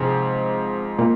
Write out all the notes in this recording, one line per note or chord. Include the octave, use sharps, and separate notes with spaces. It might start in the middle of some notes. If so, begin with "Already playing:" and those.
Already playing: G#2 C3 F3 C4 G#4
A#2